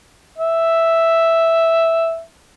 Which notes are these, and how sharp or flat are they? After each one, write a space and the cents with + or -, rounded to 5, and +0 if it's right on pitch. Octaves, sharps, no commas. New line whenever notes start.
E5 +0